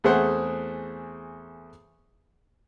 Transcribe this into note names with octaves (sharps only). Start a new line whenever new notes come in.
E2 A3 C4 G#4 C5 F#5